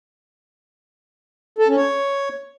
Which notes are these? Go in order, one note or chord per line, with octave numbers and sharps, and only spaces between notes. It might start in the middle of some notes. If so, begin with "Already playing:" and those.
A4
C#4
C#5